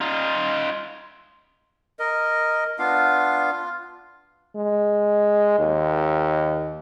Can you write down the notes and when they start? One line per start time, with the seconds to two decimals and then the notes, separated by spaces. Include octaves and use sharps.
0.01 D#4 F4
1.99 A#4 D#5
2.79 B3 D4 F4 F5
3.52 F4
4.56 G#3
5.59 D#2